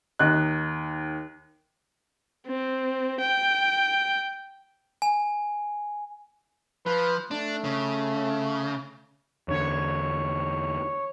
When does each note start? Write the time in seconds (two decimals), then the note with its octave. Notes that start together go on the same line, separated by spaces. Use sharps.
0.19 D#2 D#4 F#6
2.47 C4
3.21 G5
5.02 G#5
6.86 F3 B4
7.31 A3 D4
7.64 C#3
9.48 E2 D3 C#5